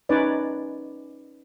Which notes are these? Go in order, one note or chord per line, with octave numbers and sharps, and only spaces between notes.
C#4 D#4 B4 C#5 D5